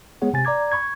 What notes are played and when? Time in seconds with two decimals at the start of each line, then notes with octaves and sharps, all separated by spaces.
0.22 G#3 B3 G#4 C#5 F#5
0.33 C3 G#5 A6
0.45 D5 A#5 D6 G#6
0.72 B5 C#6 G#6